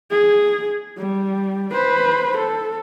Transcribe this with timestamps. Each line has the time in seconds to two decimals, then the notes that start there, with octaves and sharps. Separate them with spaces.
0.11 G#4
0.97 G3
1.72 B4 C5
2.37 A4